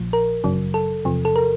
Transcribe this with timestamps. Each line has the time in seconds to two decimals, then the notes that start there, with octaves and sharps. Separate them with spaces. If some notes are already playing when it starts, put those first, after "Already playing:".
Already playing: A#1 A#2 F3
0.13 A#4
0.44 G1 F#2 C#3 F#3
0.74 A4
1.05 E2 C3 F3
1.25 A4
1.36 A#4